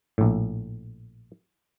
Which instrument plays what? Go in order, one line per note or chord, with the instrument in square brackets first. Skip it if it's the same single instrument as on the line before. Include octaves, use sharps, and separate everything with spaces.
[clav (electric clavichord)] A#1 A2